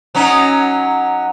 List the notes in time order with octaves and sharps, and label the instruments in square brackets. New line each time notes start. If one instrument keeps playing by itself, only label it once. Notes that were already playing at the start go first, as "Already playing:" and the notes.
[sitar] F#3 C#4 D#4